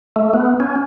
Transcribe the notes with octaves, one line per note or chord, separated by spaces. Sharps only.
A3
B3
C#4